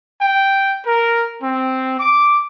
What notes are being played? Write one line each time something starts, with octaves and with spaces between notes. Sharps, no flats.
G5
A#4
C4
D6